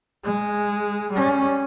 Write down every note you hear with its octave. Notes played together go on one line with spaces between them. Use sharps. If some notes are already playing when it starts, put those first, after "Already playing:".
G#3
G3 C#4